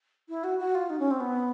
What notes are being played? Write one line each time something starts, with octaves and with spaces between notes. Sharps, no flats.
E4
F#4
F#4
F4
D#4
C#4
C4
B3